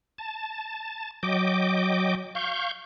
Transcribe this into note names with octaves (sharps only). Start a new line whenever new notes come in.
A5
F#3 D#5 G5 D6
F5 C#6 G6